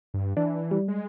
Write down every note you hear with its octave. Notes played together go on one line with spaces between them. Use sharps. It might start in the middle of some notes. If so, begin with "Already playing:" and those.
G2
E3 D4
G3
G#3